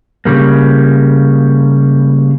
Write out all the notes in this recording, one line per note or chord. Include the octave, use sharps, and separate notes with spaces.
C#3 G3 A#3